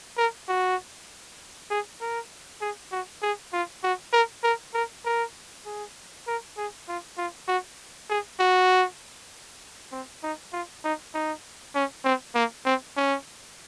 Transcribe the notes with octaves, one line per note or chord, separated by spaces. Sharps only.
A#4
F#4
G#4
A#4
G#4
F#4
G#4
F4
F#4
A#4
A#4
A#4
A#4
G#4
A#4
G#4
F4
F4
F#4
G#4
F#4
C4
D#4
F4
D#4
D#4
C#4
C4
A#3
C4
C#4